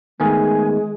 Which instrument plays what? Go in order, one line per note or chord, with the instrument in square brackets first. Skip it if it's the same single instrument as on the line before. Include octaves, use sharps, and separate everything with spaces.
[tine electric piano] D#3 A3 B3 [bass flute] G#3 [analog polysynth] G#5